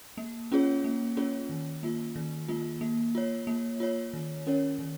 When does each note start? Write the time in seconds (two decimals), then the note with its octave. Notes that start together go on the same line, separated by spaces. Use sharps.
0.17 A#3
0.52 C#4 F4 G#4 C#5
0.84 A#3
1.17 C#4 F4 G#4 C#5
1.49 D#3
1.83 A#3 F4
2.16 D#3
2.48 A#3 F4
2.81 A#3
3.15 F4 C#5
3.47 A#3
3.80 F4 C#5
4.13 D#3
4.46 C#4 A#4 C#5
4.79 D#3